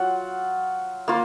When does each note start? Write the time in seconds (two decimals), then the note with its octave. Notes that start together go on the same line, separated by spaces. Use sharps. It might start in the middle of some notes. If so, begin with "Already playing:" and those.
Already playing: F#3 F4 F#5
1.08 A#3 F4